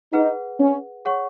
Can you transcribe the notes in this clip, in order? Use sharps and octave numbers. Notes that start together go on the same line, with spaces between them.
D#4 G#4 B4 F#5
C#4
G#4 C#5 F#5 C#6